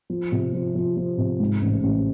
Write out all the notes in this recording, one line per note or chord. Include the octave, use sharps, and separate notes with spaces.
F3
C3
F3
F3
F3
C3
G#2
A1
A1